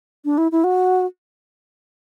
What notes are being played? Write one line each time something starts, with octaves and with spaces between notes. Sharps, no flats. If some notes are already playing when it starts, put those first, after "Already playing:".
D4
E4
E4
F#4